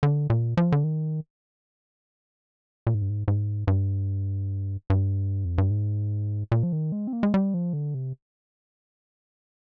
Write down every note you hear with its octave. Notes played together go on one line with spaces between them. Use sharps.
D3
A#2
F3
D3
D#3
A#2
G#2
G2
G#2
G#2
G2
G2
F2
G2
G#2
A#2
F3
D#3
G#3
C4
A#3
G#3
G3
F3
D3
C3